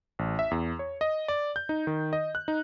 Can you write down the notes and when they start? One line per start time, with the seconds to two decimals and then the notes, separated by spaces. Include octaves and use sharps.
0.19 A1
0.39 E5
0.51 E2
0.79 C#5
1.01 D#5
1.28 D5
1.56 G6
1.69 D#4
1.87 D#3
2.13 D#5
2.35 F#6
2.48 D#4